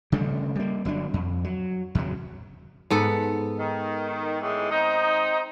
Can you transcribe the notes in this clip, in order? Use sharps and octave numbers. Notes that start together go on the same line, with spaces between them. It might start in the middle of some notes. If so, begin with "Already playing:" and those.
C#3 G3 A3 D4
G3 A#3
G1 F#3 C4 D4
F2
F#3
E2 C#3 F#3
G#2 B3 A4
D#3
A2 E3 G#3
C4 D#4